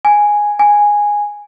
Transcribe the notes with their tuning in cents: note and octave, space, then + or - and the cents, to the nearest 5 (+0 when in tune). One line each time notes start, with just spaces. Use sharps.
G#5 +0
G#5 -5